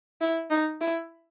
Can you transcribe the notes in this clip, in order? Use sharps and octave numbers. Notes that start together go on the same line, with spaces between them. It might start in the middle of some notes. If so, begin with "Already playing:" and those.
E4
D#4
E4